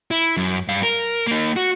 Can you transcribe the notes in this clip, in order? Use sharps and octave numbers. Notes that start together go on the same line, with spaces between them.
E4
F#2
G2 F5
A#4
A#3 D#4
F#4